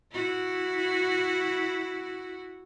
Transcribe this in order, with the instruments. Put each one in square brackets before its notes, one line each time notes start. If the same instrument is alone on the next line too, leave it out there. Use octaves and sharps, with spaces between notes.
[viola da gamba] E4 F#4